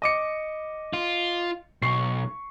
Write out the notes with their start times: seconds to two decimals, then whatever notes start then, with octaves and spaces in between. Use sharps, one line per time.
0.02 D#5 D6 C#7
0.93 F4
1.82 B1 C#6 C7